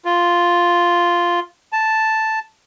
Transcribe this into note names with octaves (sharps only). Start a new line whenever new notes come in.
F4
A5